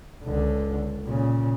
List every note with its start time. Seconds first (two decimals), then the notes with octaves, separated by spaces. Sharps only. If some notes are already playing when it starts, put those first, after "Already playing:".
0.24 C#2 D3
1.04 A#2 C#3